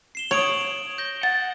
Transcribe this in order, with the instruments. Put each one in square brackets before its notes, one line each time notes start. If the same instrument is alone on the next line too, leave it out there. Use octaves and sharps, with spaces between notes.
[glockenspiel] C7 E7 G7
[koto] C#5 [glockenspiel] D#6 D7 F#7
[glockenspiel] G6 A#6 G7
[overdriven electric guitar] F#5 [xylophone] A6